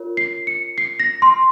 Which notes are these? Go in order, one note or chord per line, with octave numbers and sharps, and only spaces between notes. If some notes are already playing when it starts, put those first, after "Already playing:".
Already playing: F4 A#4 C#5
C7
C#7
C7
A#6
C6